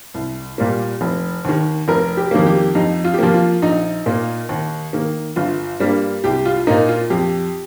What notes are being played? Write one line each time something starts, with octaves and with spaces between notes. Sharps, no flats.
C2
A#2 G3 A#3
F1
D#2 D#3
F1 A#4
G4
F2 D#3 G3 A#3
G4
F2 D#4
F4
G4
F3 A#3 F4
F4
A#1 D#4
A#2 A#3
D#2
D#3 A#3
G1 F4
G2 G3 A#3
C2 G4
F4
A#2 A#3 D#4
F4
F2 G4